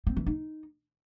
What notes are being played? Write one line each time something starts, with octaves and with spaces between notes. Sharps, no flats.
C4
E3
D#4